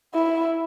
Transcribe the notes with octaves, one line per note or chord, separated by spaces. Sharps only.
E4